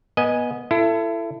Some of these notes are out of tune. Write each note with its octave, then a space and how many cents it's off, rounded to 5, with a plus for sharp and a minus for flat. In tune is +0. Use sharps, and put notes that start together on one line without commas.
B3 -25 D#5 +0 G#5 +0
E4 +30 A4 +15